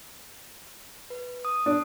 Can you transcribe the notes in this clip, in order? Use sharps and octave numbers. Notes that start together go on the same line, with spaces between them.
B4
D#6
D4